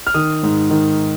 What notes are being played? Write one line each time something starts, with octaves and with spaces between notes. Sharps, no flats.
F6
D#3 D#6
G#2
D#3